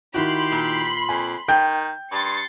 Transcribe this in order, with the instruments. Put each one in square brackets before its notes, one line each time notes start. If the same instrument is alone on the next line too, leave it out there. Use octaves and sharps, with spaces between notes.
[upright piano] D#3 E4 F#4 [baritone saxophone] G4 [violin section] B5 C6
[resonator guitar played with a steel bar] A#2
[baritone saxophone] F2 [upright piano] G#5
[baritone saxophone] D#3 [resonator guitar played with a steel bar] G5 [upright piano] G6
[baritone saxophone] G2 [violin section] C6 A6 C#7